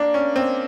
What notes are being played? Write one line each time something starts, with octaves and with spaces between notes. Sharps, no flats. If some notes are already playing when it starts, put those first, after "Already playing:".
Already playing: A#3 D4
C#4
C4